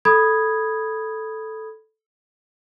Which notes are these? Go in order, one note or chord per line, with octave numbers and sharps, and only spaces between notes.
A4 B5 D#6 G#6